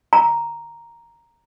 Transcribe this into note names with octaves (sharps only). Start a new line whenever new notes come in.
A#5